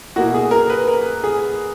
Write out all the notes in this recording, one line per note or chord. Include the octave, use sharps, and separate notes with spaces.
B2 A#3 E4 F#4
G#4
A#4
B4
A#4
G#4